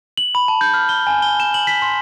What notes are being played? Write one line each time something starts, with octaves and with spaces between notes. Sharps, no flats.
F#7
B5
A5
G6
F6
G7
G#5
G7
E7
F#7
B6
C6